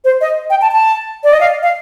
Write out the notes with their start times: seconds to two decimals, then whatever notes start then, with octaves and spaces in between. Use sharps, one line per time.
0.05 C5
0.21 D#5
0.50 G5
0.61 A5
0.72 A5
1.24 D5
1.33 D#5
1.40 F5
1.63 F5